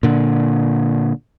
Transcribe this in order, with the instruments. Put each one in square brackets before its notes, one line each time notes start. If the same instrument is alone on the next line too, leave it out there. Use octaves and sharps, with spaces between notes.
[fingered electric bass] A#2 D3